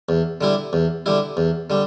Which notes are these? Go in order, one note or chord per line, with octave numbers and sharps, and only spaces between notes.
E2
D3 G3 E4
E2
D3 G3 E4
E2
D3 G3